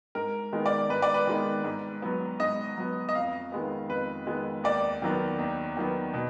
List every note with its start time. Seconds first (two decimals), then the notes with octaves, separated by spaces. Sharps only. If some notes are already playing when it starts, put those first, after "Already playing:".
0.15 G#2 A#4
0.52 D#3 G#3 B3
0.66 D5
0.90 G#2 B4
1.02 D5
1.14 B4
1.27 D#3 G#3 B3
1.64 G#2
2.02 F#3 B3
2.40 G#2 D#5
2.77 F#3 B3
3.09 D#5
3.14 F2 F5
3.52 D#3 G#3 B3
3.89 F2 B4
4.27 D#3 G#3 B3
4.64 D#2 D5
5.02 D#3 F#3 B3
5.39 D#2
5.77 D#3 F#3 B3
6.14 B2